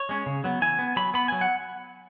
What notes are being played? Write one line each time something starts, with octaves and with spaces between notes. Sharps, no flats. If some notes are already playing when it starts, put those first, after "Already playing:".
Already playing: C#5
G#3 C#4
C#3
F#3 B3
E3 G#5
B3
F#3 B5
B3 B5
F#3 G#5
F#5